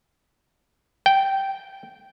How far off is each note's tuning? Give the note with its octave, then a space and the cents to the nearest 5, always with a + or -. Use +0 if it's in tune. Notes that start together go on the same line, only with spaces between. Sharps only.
G5 -10